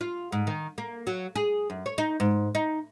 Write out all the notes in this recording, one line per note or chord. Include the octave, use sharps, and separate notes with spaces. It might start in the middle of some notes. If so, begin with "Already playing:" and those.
F4
G#2
D#3
A#3
F#3
G#4
F#2
C#5
D#4
G#2
D#4